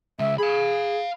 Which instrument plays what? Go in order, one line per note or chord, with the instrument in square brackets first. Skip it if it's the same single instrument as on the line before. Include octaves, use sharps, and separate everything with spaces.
[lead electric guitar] C#3 G#3 [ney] E5
[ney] G#4 [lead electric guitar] F5 B5